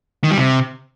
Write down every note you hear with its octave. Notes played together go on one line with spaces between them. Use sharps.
D#3
G3
C3